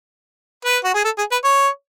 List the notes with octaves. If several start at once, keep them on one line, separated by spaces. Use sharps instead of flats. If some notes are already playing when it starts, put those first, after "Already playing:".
B4
F#4
G#4
A4
G#4
B4
C#5